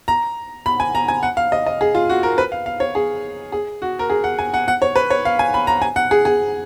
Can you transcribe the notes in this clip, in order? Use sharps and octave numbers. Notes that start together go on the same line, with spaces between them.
A#5
B5
G#5
A#5
G#5
F#5
F5
D#5
D#5
G#4
F4
F#4
A#4
B4
F5
F5
C#5
G#4
G#4
F#4
A#4
G#4
F#5
G#5
F#5
F#5
C#5
B4
C#5
F5
G#5
B5
A#5
G#5
F#5
G#4
G#4